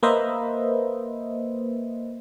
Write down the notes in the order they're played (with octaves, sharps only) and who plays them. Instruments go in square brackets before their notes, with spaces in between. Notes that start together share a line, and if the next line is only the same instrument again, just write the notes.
[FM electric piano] A#3 B4 C5 D#5 E5